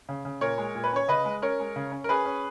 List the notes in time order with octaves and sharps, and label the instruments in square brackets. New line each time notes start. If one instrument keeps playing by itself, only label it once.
[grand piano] C#3
C#3
A#2 A#4 C#5
G#3
A#2
B4
C#4 C#5
C#3 B4 D#5
G#3
C#4 A#4 C#5
G#3
C#3
C#4
A#4
C#4 G#4 B4
C#4